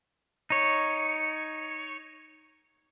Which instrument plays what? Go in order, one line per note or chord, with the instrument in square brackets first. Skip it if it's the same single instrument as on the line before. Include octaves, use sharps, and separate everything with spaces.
[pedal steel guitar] D#4 C#5